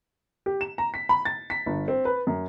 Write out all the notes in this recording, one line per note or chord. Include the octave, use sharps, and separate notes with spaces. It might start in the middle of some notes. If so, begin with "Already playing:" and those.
G4
E7
A#5
B6
B5
A6
B6
G1
C4
B4
F#2